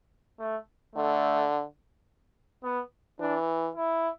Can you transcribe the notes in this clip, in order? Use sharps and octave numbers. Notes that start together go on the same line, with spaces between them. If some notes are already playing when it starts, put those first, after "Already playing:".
A3
D3 A3
B3
E3 D4
E4